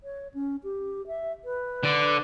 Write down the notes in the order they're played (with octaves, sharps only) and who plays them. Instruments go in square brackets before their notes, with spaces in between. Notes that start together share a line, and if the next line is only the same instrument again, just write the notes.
[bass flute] C#5
C#4
G4
E5
B4
[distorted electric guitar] D3 D5